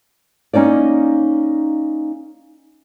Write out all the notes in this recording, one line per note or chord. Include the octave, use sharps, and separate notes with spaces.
A#3 C#4 D#4 C#5 D5